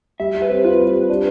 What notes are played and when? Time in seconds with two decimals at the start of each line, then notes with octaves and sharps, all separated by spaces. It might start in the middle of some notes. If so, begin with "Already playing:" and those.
0.20 G3 E5
0.35 G3
0.42 B4
0.49 C4
0.64 F4 B4
0.80 G3
0.94 G3
1.09 D4